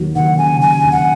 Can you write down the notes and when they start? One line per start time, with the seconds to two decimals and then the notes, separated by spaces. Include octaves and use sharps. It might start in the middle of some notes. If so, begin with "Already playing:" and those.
Already playing: D#2 F#3
0.15 D#2 F#5
0.38 C#3 G#5
0.61 F#3 G#5
0.84 D#2
0.92 F#5